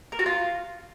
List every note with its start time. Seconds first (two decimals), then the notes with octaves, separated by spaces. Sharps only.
0.12 A#4
0.19 F#4
0.26 F4